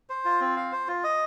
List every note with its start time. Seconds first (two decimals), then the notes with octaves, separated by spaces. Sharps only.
0.10 C5
0.25 F4
0.40 C4
0.56 F5
0.72 C5
0.88 F4
1.04 D#5